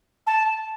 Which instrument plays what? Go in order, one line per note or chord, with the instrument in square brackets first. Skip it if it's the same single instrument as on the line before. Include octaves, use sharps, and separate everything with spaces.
[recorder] A5